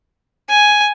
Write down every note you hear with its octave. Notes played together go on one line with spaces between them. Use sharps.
G#5